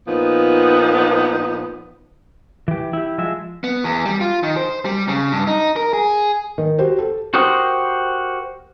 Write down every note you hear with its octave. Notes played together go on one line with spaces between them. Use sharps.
A#2 F3 B3 D#4
E3 G4
E4 G4
F3 G#3 E5
B3
E2
G3
F4
D#3
C5
G3
C#3
G2
D#4
A#4
G#4
D#3
F#4 G4 C5
A4
F#4 G4 A#4 C5 D#6